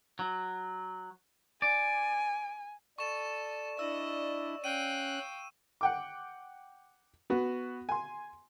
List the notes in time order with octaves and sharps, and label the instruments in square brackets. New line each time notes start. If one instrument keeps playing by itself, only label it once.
[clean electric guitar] F#3
[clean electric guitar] D5 [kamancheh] G#5
[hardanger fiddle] A4 [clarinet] D5 [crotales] C#6 E7
[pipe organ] D4 E4 [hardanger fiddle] D#5 [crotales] E6
[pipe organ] C#4 F#6 [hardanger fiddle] F5 G5 [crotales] D#7
[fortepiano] F#5 G5 D6
B3 F#4
G#5 C6